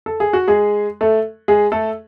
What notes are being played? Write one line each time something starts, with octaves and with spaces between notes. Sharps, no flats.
A4
G#4
F#4
G#3 G#4
A3 A4
G#3 G#4
A3 A4